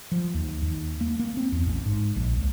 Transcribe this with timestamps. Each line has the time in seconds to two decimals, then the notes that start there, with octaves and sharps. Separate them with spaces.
0.12 F3
0.34 D#2
0.62 D#2
1.01 A#3
1.19 A#3
1.37 C4
1.52 E2
1.67 A1
1.86 G#2
2.16 A#1
2.36 C#2